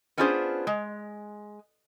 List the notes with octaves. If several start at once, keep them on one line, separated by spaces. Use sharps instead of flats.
B3 C#4 D4 F4 G#4 C5
G#3